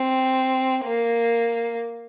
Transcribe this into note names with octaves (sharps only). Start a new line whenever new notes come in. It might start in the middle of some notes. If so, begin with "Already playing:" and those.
Already playing: C4
A#3